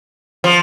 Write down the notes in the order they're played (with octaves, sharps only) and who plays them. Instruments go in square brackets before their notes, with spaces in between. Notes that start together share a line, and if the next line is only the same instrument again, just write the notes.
[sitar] F3